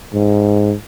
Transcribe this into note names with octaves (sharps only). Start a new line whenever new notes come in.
G#2